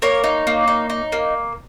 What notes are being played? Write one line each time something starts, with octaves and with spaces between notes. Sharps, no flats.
A#3 A#4 C#5
D#4
A#3
D#4
D#4
A#3